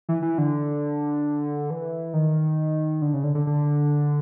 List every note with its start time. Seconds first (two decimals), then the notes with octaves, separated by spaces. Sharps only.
0.09 E3
0.22 E3
0.38 D3
1.70 E3
2.13 D#3
3.02 D3
3.14 C#3
3.24 D3
3.35 D3
3.47 D3